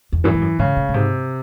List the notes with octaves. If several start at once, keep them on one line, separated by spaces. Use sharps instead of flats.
E2
F#2 E3
G#2
F#2
G#2 C#3
A2
A2
G#2 C3